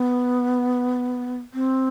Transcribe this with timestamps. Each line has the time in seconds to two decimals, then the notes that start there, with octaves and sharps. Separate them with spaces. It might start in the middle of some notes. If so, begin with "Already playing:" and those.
Already playing: B3
1.54 C4